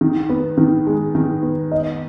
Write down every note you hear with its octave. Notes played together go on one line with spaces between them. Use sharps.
D#3
B3
D#3
G#3
D#3
B3
D#5